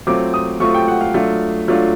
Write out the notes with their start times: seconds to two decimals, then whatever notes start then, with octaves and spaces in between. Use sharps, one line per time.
0.07 F#3 A3 C4 F4 D6
0.34 D#6
0.60 F#3 A3 C4 F4 C#6
0.74 G5
0.88 F#5
1.01 F5
1.14 F#3 A3 D4 F4
1.68 F#3 A3 D4 F4